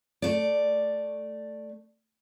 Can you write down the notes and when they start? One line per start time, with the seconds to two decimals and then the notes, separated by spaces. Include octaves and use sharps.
0.22 A3 D5